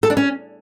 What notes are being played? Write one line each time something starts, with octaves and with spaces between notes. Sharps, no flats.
A4
D4
C#4